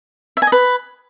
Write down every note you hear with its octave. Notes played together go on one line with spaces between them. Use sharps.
E5
G#5
D#5
B4